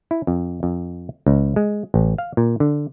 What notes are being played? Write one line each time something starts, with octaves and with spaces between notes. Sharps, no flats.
E4
F2
F2
C#2
G#3
A1
F5
A#2
D3